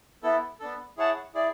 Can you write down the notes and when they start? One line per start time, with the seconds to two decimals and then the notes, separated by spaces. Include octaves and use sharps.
0.23 B3 E4 A4
0.60 B3 D4 A4
0.97 E4 G#4 C#5 F#5 A5
1.34 E4 G#4 D5